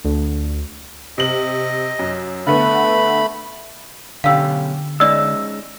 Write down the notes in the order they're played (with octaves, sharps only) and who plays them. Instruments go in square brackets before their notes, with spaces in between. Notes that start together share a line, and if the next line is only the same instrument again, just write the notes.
[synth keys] D2
[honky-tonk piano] C3 F#7 [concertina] D#5
[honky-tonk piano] F#2
[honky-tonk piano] D3 B3 [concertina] A3 B5
[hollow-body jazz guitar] B1 C#4 G4 [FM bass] D3 [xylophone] F5 E6
[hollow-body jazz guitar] G#3 C#4 D#4 [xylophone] D5 D#5 [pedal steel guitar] E6